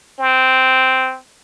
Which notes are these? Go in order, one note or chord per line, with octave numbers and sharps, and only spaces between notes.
C4